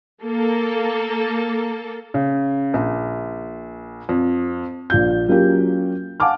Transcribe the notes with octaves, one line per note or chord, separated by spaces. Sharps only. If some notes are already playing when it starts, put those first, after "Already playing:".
A#3 A4
C#3
A#1
F2
A#1 F4 G6
F#3 A#3 C#4 F4 G4
F5 F#5 G#5 A5 D6 F6